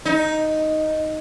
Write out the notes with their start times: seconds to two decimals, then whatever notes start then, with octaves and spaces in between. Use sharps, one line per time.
0.05 D#4